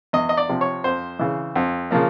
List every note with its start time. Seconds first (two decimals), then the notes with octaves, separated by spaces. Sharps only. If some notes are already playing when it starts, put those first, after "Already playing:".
0.13 E2 D#5
0.29 D#5
0.37 D5
0.49 C3 F3
0.61 C#5
0.84 F2 C5
1.19 C#3 E3
1.56 F2
1.91 C#3 F3 A#3